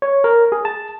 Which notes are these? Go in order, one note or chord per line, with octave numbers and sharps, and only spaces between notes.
C#5
A#4
G#4
A5